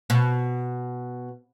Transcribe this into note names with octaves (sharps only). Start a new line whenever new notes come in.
B2